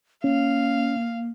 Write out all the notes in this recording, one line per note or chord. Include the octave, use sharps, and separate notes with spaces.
A#3 C#4 F5